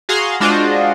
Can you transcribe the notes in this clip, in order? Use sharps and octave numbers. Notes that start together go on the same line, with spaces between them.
F#4 G#4 F5 A#5 C6
G#3 D4 F4 F#4 C5 D#5